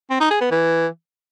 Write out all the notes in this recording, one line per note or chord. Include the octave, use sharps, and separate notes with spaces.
C4
D#4
G#4
B3
E3